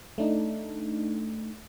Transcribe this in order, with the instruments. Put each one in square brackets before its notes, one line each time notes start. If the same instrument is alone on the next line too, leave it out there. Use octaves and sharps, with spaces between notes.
[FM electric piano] A3 D4 D#4